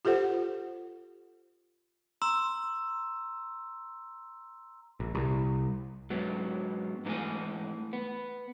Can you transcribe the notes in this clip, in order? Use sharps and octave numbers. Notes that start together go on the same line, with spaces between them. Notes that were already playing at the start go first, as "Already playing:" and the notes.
F4 G4 A4 C5 F#5
A#5 C6 E6
A#1
C2
G#2 F#3 B3
G#2 D#3 E3 A3 G#5
B3